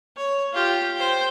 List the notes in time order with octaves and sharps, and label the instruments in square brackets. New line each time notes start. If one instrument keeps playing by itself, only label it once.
[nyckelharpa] C#5
F4 G4
C5 G5